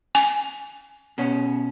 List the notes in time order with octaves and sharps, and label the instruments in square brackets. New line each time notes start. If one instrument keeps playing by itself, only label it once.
[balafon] G#5
[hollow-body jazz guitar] B2 C#4